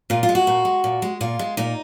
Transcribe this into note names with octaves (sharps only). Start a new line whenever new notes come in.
A#2 F4
F4
G#3
F#4
A#2
G#3
A#2
G#3
A#2 F4
G#3
A#2 D#4